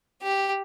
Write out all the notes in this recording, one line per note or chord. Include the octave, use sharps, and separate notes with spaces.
G4